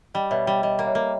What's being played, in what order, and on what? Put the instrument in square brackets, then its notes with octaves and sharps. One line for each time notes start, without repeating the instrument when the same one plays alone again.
[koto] G3 [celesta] D#5 G5
[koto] B2 [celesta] C#5 E5
[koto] G3 [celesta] D#5 G5
[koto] G3 [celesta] D#5 G5
[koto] A#3
[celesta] C#5 E5
[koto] A#3